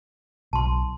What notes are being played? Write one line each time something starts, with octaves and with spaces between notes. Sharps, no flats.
B1 A5 C6